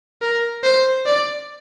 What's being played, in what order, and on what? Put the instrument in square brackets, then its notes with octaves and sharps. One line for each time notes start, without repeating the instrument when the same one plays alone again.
[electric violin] A#4
C5
D5